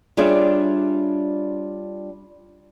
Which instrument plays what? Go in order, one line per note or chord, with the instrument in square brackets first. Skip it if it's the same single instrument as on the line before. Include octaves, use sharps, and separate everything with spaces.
[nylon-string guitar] G3 D4 F4 G#4 C#5 E5